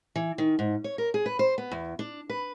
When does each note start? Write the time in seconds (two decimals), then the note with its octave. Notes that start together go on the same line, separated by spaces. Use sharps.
0.15 E3
0.38 D#3
0.59 G#2
0.84 C#5
0.98 A#4
1.14 G#4
1.26 B4
1.39 C5
1.58 B3
1.72 E2
1.99 D4
2.30 B4